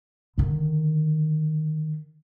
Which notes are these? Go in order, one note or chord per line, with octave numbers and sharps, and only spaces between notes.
D3 D#3